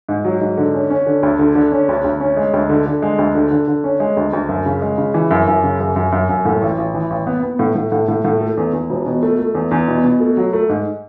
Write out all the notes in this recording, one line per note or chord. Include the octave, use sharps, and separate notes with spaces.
G#2
F#3
G#2
D3
C#4
C#4
D3
D2
D3
D3
C#4
D2
D2
C#4
G#3
D2
D3
D3
G#3
D2
D3
D3
D3
C#4
G#3
D2
D2
F#2
C#3
G#3
C#3
E3
F#2
F#2
C#3
F#2
F#2
F#2
F#2
A2
A1
A1
E3
A1
B3
B3
A2
A2
A2
A2
A2
A3
E2
E2
E1
B2
A3
A3
E2
E2
B2
B2
A3
F#3
A3
G#2